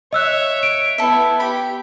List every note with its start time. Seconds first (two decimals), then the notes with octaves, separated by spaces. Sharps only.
0.13 C#5 D#5 E5 E6 F#6
0.63 D7
0.98 B3 E4 A4 E5
1.40 G4 B5